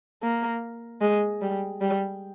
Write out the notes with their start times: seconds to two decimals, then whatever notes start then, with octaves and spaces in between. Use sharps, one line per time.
0.23 A#3
1.01 G#3
1.42 G3
1.81 G3